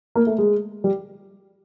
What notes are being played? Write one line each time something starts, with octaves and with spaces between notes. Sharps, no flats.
A#3
A3
G#3
G3